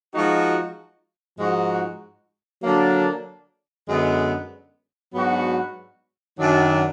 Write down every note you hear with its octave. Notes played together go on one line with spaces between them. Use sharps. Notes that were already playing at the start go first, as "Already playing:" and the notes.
F3 G#3 D#4 F#4
G#2 F3 G#3 D#4 F#4
D3 F#3 A#3 D4
F#2 D3 G#3 B3
G#2 F#3 B3 D4 F#4
F#2 D#3 F#3 D4